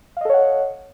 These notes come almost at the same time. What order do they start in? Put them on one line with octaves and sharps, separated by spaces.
F5 D#5 A4 C#5 F#5